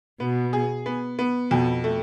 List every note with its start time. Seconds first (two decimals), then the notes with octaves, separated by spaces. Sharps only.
0.20 B2 B3
0.53 G#4
0.86 B3
1.19 B3
1.51 F2 B2
1.84 A3